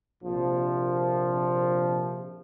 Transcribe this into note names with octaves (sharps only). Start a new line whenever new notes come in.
A#1 C3 F3